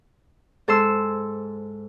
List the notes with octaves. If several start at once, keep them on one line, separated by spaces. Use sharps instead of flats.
G#2 A4 C5 C6 E6